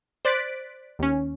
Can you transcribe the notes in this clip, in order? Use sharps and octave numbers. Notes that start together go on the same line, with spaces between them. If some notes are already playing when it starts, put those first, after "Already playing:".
C5 D5 F#6 A6 B6 D7
D#2 C#4